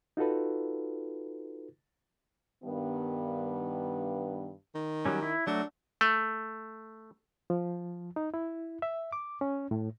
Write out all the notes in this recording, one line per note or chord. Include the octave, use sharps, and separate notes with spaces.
D#4 F4 F#4 A4 B4
G2 D#3 B3
D#3
F#3 G3 C#4
E4
F#3 A3 D4 F#4
A3
F3
D#4
E4
E5
D6
C#4
A2